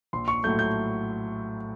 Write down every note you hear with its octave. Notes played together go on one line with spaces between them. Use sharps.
A#1 C6
C#6
A2 F#3 A3 G6
G6